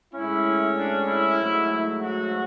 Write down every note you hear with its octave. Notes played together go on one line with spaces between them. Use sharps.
A2 G#3 C#4 E4
D4
E4
G#2 F#3 A3
F#4